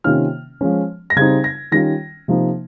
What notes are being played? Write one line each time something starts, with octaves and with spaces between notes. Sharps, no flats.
C3 D#3 A#3 C#4 F4 F6
F3 G#3 C#4
A#6
C#3 G3 C4 D#4 G#6
A#6
D#3 G3 C#4 F4 A#6
C3 F3 A#3 D#4